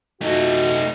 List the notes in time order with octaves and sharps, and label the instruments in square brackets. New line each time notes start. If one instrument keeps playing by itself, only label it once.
[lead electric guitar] A3 D#4 [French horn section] F#4